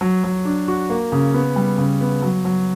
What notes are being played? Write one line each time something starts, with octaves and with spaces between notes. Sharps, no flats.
F#3
F#3
D4
F#4
A#3
C#3
B3
G3
C#3
B3
F#3
F#3